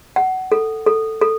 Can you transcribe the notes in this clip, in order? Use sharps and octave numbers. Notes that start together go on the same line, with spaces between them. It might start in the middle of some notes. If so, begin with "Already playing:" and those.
F#5
A4
A4
A4